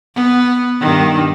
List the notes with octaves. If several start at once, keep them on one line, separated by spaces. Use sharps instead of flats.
B3
G2 D#3